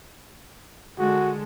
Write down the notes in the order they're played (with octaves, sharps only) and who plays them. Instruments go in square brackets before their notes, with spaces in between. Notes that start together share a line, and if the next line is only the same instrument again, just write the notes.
[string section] D3 G#3 A4 [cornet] F#4